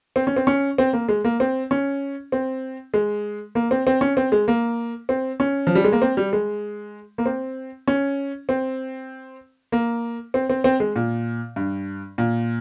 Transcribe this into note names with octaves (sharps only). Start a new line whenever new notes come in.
C4
C#4
C4
C#4
C4
A#3
G#3
A#3
C4
C#4
C4
G#3
A#3
C4
C4
C#4
C4
G#3
A#3
C4
C#4
F3
G3
G#3
A#3
C4
G3
G#3
A#3
C4
C#4
C4
A#3
C4
C4
C4
G#3
A#2
G2
A#2